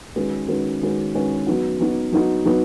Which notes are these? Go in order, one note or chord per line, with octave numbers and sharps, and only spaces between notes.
D#3 G#3 C#4 F#4 B4
D#3 G#3 C#4 F#4 B4
D#3 G#3 C#4 F#4 B4
D#3 G#3 C#4 F#4 B4
F#3 B3 D#4 F#4
F#3 B3 D#4 F#4
F#3 B3 D#4 F#4
F#3 B3 D#4 F#4